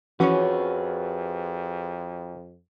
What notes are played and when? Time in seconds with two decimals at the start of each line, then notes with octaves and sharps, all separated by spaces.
0.20 F2 E3 F3 C#4 F#4 G#4 B4 C#5